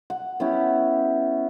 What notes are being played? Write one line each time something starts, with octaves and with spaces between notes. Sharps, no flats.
F#5
B3 C#4 E4 G4